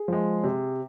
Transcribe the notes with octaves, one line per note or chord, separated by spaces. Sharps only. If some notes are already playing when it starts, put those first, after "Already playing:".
Already playing: G#4
F3 G#3
C3